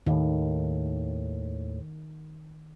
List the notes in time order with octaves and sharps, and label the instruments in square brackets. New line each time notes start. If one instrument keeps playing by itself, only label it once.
[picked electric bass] D#2 A2 [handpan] D#3